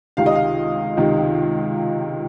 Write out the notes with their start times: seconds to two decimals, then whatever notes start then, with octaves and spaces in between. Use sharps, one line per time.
0.17 C#2 C3 D#3 F5
0.26 D#5
0.35 F5
0.97 C#2 C3 D#3